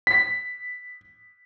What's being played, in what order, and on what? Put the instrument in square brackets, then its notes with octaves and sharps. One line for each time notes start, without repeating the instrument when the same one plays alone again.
[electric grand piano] B6